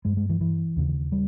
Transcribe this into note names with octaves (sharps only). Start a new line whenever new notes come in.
G2 G#3
G#3
E3
E3
D#2 C#3
G3